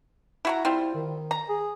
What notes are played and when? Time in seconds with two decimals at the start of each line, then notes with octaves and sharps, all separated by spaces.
0.45 E4 F#4 A#5
0.65 G3 C4 E4 F4
0.94 D#3
1.31 A#5
1.49 G#4